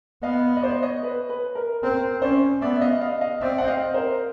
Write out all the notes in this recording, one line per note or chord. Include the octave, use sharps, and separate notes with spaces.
B3 D#5 F5
D#5
C5 D5
C#5 D#5
B4
B4
A#4
C4 A#4
C#4 C5 D5
B3 D5 E5
E5
D#5 F5
D#5 F5
D#5 F5
C4 D5 E5
F#5
D#5 F5
A#4 C5